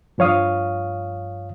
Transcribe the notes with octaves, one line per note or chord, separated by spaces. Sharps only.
G2 F3 C#5 F5 D#6